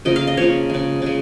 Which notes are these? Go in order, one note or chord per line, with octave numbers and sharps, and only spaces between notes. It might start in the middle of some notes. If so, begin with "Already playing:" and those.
C#3 F3 A#3 D#5
F5
D#5
C#3 F3 A#3 C#5
C#3 G#3
C#3 G#3